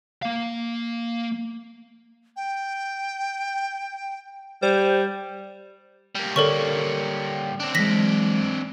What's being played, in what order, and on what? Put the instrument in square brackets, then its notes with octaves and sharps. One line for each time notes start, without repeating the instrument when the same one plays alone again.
[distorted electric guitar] A#3 F5
[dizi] G5
[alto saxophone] G3 [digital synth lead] C5
[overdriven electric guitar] G3 A#3
[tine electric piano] D3 C#5 D5 [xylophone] A4 A#4 C#6
[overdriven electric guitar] C4 D4
[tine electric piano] E3 F#3 G#3 [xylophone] A#6 B6 F#7